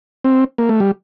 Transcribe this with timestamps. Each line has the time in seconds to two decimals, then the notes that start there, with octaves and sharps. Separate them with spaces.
0.24 C4
0.58 A#3
0.69 A3
0.80 G3